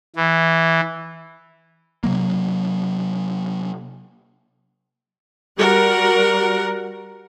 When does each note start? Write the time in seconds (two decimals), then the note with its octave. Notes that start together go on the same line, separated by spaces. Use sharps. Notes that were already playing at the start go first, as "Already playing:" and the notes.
0.16 E3
2.04 C3 F#3 A#3
5.59 G3 F#4 A#4 F#5